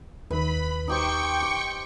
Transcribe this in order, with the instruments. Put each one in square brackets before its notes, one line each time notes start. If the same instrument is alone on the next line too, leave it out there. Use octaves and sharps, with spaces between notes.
[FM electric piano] D#2 D#3 [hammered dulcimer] B4 [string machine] B5
[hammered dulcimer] D#4 G4 C5 [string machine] G5 C#6 C#7
[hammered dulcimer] D6